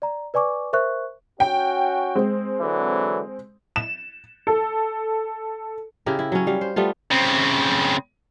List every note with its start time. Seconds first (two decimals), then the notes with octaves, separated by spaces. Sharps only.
0.02 D5 A#5
0.34 B4 D5 G#5 C#6 D6
0.73 A#4 C5 E5 C#6 F#6
1.40 C#4 F#4 G5
2.15 G#3 C4
2.61 D3 E3 F#3
3.76 E7
4.47 A4
6.06 C#3 E4 G4 A#4
6.19 E4
6.32 F#3 C#4
6.47 G3 F5
6.61 C5
6.76 G3 A3 B3 F4
7.11 C#3 C4